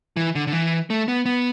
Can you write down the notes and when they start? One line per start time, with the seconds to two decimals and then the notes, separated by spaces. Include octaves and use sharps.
0.17 E3
0.35 D3
0.47 D3
0.53 E3
0.90 A3
1.08 B3
1.26 B3